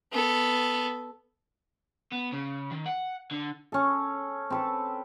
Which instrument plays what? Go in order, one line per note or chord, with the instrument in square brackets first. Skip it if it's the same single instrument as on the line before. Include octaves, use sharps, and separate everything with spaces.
[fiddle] B3 A4
[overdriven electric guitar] B3
C#3
D#3
F#5
D3
[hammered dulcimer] C#4 A4
C4 A4 B4